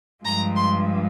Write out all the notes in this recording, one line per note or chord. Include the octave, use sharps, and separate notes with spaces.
G2 F3 G#3 A#5
C6